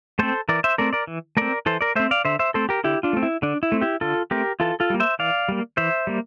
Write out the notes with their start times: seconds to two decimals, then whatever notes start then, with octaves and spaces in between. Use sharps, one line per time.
0.19 A3 C4 A4 C5
0.49 E3 A#4 D5
0.64 C5 E5
0.78 A3 C4 A#4 D5
0.93 A#4 D5
1.07 E3
1.37 A3 C4 A#4 D5
1.66 E3 A4 C5
1.81 A#4 D5
1.96 A3 C4 C5 E5
2.11 D5 F5
2.25 D3 C5 E5
2.39 C5 E5
2.54 A3 C4 A4 C5
2.69 G4 A#4
2.84 D3 E4 G4
3.03 D4 F4
3.13 A3 C4
3.23 E4
3.42 D3 D4
3.63 E4
3.72 A3 C4
3.81 E4 G4
4.01 D3 F4 A4
4.31 A3 C4 G4 A#4
4.60 E3 F4 A4
4.80 F4 A4
4.90 G3 A#3
5.00 C5 E5
5.19 E3 D5 F5
5.49 G3 A#3
5.77 E3 C5 E5
6.07 G3 A#3